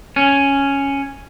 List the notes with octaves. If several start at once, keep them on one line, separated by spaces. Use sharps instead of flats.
C#4